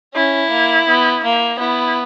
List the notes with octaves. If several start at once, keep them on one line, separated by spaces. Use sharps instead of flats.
C#4 E4
A#3
B3
A#3
B3 E4